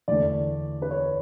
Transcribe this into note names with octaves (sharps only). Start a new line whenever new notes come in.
E2 D3 A3 D5
B4
C#5